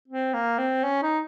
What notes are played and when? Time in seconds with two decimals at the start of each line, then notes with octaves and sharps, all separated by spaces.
0.08 C4
0.34 A#3
0.58 C4
0.84 C#4
1.03 D#4